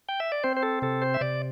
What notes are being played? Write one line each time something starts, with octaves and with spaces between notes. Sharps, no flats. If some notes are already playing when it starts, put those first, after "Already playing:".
G5
E5
D5
C4 C5
C5
A4
C3 A4
C5
E5
C3 D5